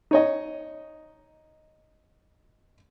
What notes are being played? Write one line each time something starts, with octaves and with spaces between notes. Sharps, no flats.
D#4 C#5 D#5